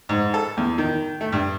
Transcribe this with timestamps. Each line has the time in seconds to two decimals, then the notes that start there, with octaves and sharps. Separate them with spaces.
0.09 G#2
0.34 A4
0.57 E2
0.78 D#3
1.21 A3
1.32 G2